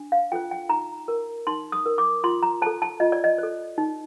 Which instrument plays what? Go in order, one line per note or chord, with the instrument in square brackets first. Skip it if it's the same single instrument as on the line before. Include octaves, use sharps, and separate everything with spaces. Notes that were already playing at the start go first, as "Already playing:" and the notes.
Already playing: [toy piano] D4
F5
F4 A4 C5 G5
G5
D#4 A#5
A#4
D#4 C6
D#6
A#4
D6
F4 C6
A#5
A4 C5 A5
A5
F4 D#5
D5
D#5
A4 C5
D#4